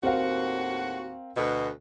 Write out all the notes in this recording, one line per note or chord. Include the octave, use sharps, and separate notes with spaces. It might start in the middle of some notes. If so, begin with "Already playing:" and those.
D#2 A2 C4 F#4 A#4 F5
D2 B2